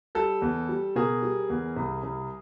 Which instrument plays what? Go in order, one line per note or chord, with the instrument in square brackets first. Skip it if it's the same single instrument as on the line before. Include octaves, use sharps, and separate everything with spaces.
[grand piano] G3 A4
E2
G3
B2 G#4 A#4
G3
E2
C2
C2